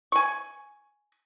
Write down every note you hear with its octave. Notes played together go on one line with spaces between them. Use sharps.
G#5 C#6